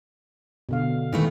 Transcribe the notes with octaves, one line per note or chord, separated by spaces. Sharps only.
B2 D3 F5
D#3 E3 A3